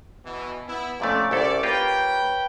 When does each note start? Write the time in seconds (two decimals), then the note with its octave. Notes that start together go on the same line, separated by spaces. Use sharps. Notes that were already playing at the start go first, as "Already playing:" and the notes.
0.24 B2 E3
0.67 B3 E4
1.00 F2 A#2 A3 C#4 E4 D5
1.31 C2 C#4 E4 A4 C5 D5
1.63 A#3 F4 G4 B4 C#5 G5